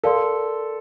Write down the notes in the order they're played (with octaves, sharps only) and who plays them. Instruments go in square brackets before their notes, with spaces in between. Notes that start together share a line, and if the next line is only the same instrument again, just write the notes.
[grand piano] A4 [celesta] A#4 D5 F5 C6